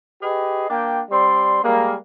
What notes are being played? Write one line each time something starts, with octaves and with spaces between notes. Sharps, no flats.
G4 G#4 B4 D#5
A#3 D4 G5
G3 C4 D5 C6
G3 G#3 A#3